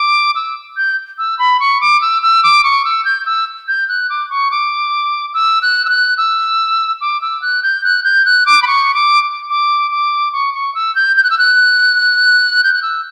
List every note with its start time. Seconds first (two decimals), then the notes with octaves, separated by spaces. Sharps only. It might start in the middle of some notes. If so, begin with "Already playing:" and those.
Already playing: D6
0.35 E6
0.77 G6
1.18 E6
1.39 B5
1.60 C#6
1.81 D6
2.01 E6
2.22 E6
2.43 D6
2.64 C#6
2.85 E6
3.05 G6
3.26 E6
3.68 G6
3.88 F#6
4.10 D6
4.30 C#6
4.51 D6
5.34 E6
5.62 F#6
5.85 E6
5.89 F#6
6.17 E6
7.01 D6
7.21 E6
7.42 F#6
7.63 G6
7.84 F#6
8.04 G6
8.25 F#6
8.46 D6
8.62 B5
8.67 C#6
8.94 D6
9.50 D6
9.91 D6
10.33 C#6
10.54 C#6
10.75 E6
10.95 G6
11.16 G6
11.23 F#6
11.30 E6
11.38 F#6
12.64 G6
12.73 F#6
12.82 E6